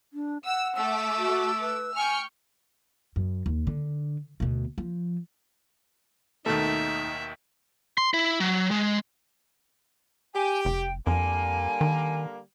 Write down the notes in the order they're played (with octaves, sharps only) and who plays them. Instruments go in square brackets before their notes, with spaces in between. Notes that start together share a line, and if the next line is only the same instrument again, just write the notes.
[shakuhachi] D4
[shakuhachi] F#5 [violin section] E6
[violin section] A3 D6 [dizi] E6
[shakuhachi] F#4
B4
[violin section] G5 C#6 F6 [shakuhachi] G#5
[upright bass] F#2
D#2
D3
D2 B2
F3
[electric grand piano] D#2 B2 D#3 [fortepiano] A3 [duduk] D#4 [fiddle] E5
[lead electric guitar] C6
E4
F#3
G#3
[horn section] G4 [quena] G#5
[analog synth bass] F1 [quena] G5
[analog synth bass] F2 [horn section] D3 G3 A#3 [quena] G#5
[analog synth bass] D#3